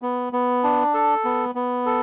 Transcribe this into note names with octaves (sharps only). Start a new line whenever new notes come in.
B3
B3
D4
A4
B3
B3
A4